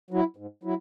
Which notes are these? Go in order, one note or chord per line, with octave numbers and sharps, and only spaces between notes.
F#3 E4
G#2
F#3 E4